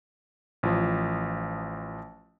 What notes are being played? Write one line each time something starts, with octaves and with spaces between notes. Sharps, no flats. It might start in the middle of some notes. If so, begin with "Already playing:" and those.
A1 F3